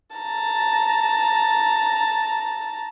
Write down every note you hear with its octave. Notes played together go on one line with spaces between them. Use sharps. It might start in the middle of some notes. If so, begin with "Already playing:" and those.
A5 A#5